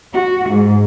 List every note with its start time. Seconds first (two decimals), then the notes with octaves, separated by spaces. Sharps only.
0.13 F#4
0.50 G#2